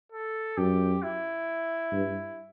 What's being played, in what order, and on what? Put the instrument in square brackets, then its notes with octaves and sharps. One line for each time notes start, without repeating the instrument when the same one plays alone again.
[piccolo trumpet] A4
[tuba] F#2 [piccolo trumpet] G4
[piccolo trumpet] E4
[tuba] G2